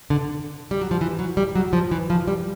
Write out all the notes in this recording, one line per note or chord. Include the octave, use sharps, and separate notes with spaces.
D3
G3
F#3
F3
E3
F#3
G3
F#3
F3
E3
F3
G3